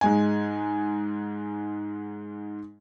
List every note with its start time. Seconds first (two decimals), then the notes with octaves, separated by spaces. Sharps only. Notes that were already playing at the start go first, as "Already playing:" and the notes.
0.01 G#2 G#3 G#5